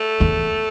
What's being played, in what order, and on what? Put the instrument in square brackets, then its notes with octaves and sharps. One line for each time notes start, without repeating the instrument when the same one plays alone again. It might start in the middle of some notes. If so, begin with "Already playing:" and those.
Already playing: [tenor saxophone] A3
[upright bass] E2